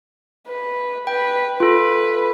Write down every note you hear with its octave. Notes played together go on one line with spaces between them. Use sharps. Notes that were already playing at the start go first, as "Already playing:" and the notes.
B4
B4 G5
F4 A4 B4